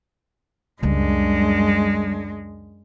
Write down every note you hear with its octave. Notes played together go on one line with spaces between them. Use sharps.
C#2 F#2 C#3 G3 G#3 D4